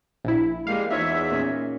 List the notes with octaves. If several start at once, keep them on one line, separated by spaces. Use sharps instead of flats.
A#1 E4
G3 G#3 A#3 F5 C7
E2 D#4 F4 C#5 E5
A#2 C#4